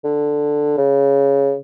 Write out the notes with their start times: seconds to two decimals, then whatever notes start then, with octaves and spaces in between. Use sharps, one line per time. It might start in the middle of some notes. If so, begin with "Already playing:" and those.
0.04 D3
0.78 C#3